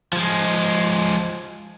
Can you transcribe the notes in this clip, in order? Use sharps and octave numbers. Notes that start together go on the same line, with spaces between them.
F3 G#3